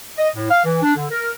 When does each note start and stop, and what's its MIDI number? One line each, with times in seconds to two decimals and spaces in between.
0.17 0.29 75
0.36 0.49 45
0.51 0.64 77
0.65 0.81 52
0.83 0.96 62
0.96 1.07 50
1.10 1.35 70